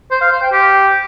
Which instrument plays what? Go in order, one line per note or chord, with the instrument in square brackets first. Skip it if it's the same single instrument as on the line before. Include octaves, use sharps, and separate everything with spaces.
[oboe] C5
F5
C5
G5
G4